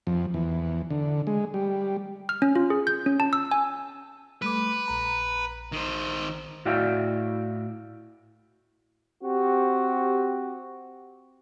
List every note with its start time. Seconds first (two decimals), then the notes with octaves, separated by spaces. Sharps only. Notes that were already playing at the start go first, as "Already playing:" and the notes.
0.07 F2
0.34 E2
0.90 D3
1.27 G#3
1.54 G3
2.29 F6
2.42 C#4
2.56 F4
2.70 G#4
2.87 G6
3.06 C#4
3.20 A5
3.33 E6
3.51 G#5
4.42 G3 A3 B4 D6
4.88 A#1 A#5
5.72 D#3 C5
6.65 A2 E4 F#4 D5 F5 G5
9.24 C4 F#4 G4